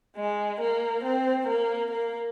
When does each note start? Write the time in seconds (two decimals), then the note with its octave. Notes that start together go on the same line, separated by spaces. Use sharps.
0.17 G#3
0.61 A#3
1.04 C4
1.47 A#3
1.90 A#3